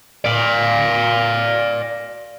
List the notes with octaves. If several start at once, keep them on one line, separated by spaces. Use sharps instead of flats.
D5 F5